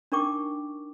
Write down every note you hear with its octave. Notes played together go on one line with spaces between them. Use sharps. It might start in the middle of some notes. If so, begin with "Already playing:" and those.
D4 D#4 A#4 G5 C#6 D6